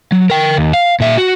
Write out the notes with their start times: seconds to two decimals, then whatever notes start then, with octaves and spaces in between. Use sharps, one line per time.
0.12 F#3
0.30 A#4 G5
0.57 D#2
0.73 F5
1.00 A#2 E5
1.18 F#4